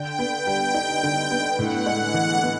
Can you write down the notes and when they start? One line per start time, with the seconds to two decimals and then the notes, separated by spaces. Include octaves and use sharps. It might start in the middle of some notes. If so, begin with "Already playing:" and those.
Already playing: D3 G5
0.19 B3
0.33 G5
0.47 G3
0.74 D#4
1.03 D3
1.31 B3
1.58 A2 F#5
1.86 G#3
2.01 F#5
2.14 E3
2.42 B3